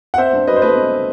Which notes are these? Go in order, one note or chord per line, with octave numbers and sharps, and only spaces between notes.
F#5
C4 C5 E5
G2
F#3 B4 D#5
C5
A3 B4 D#5
C4